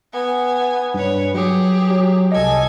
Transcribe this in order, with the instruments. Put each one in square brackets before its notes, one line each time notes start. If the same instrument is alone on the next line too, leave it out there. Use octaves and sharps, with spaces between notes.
[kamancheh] B3 G#5
[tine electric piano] G2 [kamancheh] B4 C#5
[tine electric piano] F#3 [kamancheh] G4 G#4
[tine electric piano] F#3
[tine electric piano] C2 D#5 [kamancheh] A4 G#5